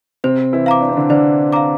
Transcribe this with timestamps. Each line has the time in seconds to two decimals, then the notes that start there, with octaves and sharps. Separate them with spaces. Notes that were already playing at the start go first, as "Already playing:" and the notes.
0.24 C3 C4 C5
0.53 E3 E4
0.66 F5 A#5 D6
0.81 D4
0.89 C4
0.97 D3 D4
1.10 D3 D4 C5
1.52 F5 A#5 D6